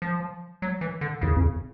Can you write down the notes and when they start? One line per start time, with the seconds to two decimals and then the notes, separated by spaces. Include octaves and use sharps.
0.02 F3
0.62 F#3
0.81 E3
1.01 D3
1.21 E2 C#3
1.37 F2